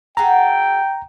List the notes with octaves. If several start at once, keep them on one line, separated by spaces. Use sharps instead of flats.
F#4 G#4 A4 G5 A#5